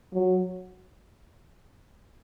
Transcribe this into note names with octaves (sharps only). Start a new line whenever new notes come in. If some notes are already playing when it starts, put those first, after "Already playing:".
F#3